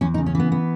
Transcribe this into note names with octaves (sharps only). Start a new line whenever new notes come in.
E2 C#4
D#4
C#3
C#4
E3 B3
B3